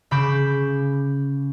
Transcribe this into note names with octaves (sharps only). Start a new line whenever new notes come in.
C#3 B5 D6 G6 E7